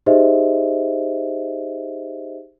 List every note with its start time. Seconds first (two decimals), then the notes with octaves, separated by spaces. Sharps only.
0.06 D#4 G4 G#4 C5 D#5 E5